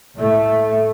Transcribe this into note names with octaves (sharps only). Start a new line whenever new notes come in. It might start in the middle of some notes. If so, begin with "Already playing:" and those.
A2 A3